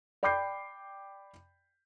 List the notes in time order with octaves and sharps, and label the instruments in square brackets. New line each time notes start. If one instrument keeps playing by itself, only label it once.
[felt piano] D5 G5 B5 D6 G6 C7